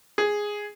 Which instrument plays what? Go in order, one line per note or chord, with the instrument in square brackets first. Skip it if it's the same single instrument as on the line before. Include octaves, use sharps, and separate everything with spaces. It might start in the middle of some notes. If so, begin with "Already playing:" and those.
[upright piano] G#4